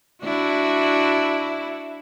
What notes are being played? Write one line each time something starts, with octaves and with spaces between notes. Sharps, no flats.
D4 E4 F#4